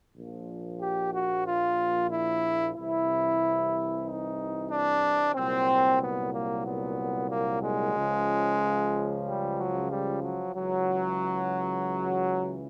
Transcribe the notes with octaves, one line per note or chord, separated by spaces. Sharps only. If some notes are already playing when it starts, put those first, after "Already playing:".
A#1 A#2 F3
G4
F#4
F4
E4
C2 C3 E3 E4
D#4
D4
C2 A#2 F#3 C4
B3
A#3
B3
A#3
G#3
C#2 C#3 F3
G3
F#3
G3
F#3
C#2 C#3 E3 F#3